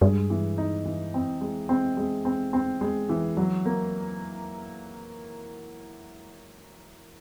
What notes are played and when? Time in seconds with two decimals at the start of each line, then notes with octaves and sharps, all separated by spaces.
0.01 G2 G#3
0.30 E3
0.58 D#4
0.85 E3
1.14 C4
1.41 G#3
1.69 C4
1.97 G#3
2.25 C4
2.53 C4
2.81 G#3
3.09 E3
3.37 F#3
3.66 A#3